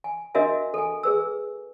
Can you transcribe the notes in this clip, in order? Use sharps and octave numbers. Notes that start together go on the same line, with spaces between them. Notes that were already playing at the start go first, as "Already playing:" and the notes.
G#5
D4 F#4 A#4 D#5 E5 G#5
A4 G#5
G#4 B4 E6